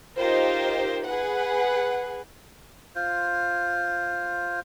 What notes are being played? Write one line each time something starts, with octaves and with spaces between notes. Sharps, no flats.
D#4 F4 G4 A#4 C5
G#4 B4 F#5
F4 C5